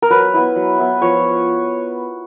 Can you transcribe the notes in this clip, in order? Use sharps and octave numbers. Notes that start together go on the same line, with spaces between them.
A#4
F#3 B4
B3 E4
F#3
B3 E4
F3 C#5